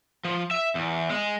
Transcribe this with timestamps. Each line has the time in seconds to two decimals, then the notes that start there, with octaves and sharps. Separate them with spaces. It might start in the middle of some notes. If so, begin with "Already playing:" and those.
0.25 F3
0.51 E5
0.75 E2
1.10 G#3